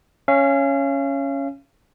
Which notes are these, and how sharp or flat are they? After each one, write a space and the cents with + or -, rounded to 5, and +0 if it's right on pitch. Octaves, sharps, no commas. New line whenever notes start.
C#4 +0 F5 -35